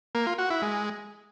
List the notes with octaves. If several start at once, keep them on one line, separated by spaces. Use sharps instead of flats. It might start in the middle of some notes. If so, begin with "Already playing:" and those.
A#3
F4
F#4
E4
G#3